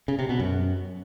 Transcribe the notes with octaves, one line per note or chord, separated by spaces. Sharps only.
C#3
C3
B2
F#2